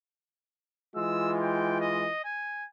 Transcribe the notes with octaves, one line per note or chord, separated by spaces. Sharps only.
E3 G#3 F4 E6
G5
D#5
G#5